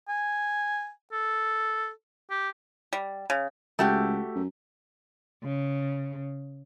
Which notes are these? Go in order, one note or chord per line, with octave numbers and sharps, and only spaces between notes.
G#5
A4
G4
G3
C#3
C#2 A3 F#4 G4
F#2
C#3